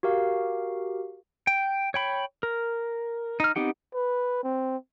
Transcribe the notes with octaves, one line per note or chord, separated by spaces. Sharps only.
F#4 G4 A#4 F5
G5
C#5 G5 B5
A#4
D#4 F6
B3 C4 D#4 G4 F#5
B4
C4